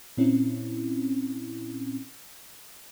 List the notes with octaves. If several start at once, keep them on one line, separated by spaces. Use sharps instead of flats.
A#2 C4 C#4 E4